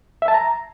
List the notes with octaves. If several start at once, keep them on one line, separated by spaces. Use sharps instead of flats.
E5
A5
A#5